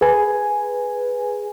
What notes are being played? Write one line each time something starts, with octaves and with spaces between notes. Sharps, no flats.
G#4 B4 G#5